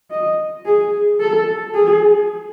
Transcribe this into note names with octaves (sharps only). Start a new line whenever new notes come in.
D#5
G#4
A4
G#4